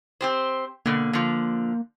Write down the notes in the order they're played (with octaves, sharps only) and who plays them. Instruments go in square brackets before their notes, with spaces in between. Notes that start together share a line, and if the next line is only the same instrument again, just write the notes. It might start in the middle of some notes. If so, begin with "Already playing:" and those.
[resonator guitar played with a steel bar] C4 G4 C5
[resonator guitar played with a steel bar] B2 D3 [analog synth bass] A#3
[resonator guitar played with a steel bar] D3 F3